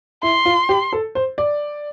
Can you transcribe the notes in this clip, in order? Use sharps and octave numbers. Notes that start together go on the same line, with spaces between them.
E4 C6
F4
G4
A4
C5
D5